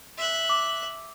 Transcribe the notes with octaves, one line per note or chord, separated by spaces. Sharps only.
E5 F#6
D6